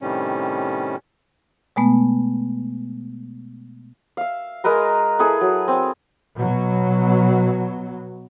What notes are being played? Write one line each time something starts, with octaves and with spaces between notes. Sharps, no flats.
A2 C3 D#3 G3 C#4
B2 G#3 A3 B3
E5 F5
G#3 A#4 B4 A#5
E4 G#4 A4 B4
F#3
C4
B2 F#3